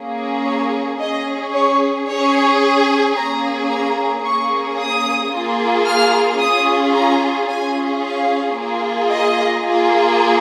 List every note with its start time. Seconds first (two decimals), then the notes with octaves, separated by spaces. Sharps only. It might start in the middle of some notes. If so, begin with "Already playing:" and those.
Already playing: A#3 C#4 G#4
0.46 C#5
1.00 C#4 G#4 D#5
1.54 C#5
2.08 C#4 G#4 C#5
3.15 A#3 C#4 G#4 A#5
3.70 A#5
4.24 A#3 C#4 G#4 C#6
4.78 D#6
5.31 A#3 F4 G#4
5.86 F6
6.39 C#4 F4 G#4 D#6
6.94 A#5
7.48 C#4 F4 G#4 G#5
8.02 F5
8.56 A#3 F4 G#4
9.10 D#5
9.64 A#3 F4 G#4